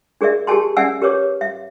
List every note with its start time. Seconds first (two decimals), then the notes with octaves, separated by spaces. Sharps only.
0.21 D4 G#4 A#4 D5 E5
0.47 G4 G#4 A#4 G#5 A5 C6
0.77 C#4 D5 E5 F#5 G#5 E6
1.02 G4 A#4 B4 C#5 D6
1.41 E5